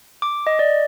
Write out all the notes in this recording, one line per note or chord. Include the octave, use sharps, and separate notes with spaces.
D6
D#5
D5